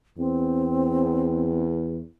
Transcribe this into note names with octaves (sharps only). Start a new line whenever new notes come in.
E2 C4